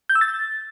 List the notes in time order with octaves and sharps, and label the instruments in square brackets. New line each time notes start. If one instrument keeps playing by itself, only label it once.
[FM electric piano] G6
E6
A6